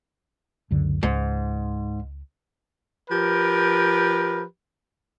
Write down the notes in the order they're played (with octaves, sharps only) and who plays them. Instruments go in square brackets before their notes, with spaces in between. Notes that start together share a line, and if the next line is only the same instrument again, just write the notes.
[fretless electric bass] C#2 F#2 D3
[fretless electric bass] C#2 [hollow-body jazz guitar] G#2
[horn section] F3 G4 A#4 B4